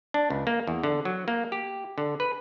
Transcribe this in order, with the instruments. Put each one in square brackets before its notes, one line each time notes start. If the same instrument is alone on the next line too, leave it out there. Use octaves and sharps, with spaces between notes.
[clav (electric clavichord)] D4
C#2
A#3
E2
D3
F#3
A#3
G4
D3
B4